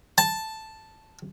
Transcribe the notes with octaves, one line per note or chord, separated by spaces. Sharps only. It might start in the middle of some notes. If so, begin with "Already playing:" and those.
A5